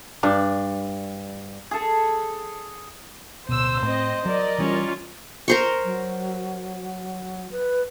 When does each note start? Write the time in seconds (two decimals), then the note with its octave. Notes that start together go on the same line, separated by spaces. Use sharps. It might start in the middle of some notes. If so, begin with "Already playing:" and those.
0.23 G2 D4
1.71 G#4 A4
3.49 D1 B2 C5 E6
3.83 A2 C4 D#5
4.25 F#3 A#4 D5 D#5
4.58 E3 G3 C#4 F4
5.48 A#4 C5 C#6
5.84 F#3
7.52 B4